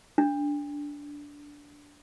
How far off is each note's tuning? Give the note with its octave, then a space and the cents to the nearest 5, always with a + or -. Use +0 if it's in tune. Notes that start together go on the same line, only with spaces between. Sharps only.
D4 -10